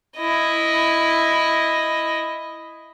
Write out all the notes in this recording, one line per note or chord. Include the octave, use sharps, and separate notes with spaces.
E4 D#5